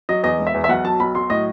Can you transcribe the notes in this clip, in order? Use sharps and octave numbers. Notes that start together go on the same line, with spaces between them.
F#3 D#5
E2 D#5
E1
E5
E2
E5
B1 F#5
F#3 A5
B1 B5
F#3 C6
A2 D#5